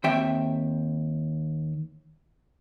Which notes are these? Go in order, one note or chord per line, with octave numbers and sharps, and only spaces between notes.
D#2 C4 E5 G5